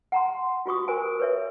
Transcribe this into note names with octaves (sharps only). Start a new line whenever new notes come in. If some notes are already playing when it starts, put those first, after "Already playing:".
F#5 A#5 C6
F4 F#4 C#6 D#6
A#4 C5 G#5
B4 C#5 E5